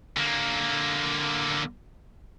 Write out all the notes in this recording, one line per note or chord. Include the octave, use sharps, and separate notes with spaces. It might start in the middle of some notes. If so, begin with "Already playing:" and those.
D3 A#3